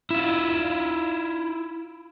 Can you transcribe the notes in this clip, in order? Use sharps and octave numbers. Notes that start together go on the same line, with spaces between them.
E4 F4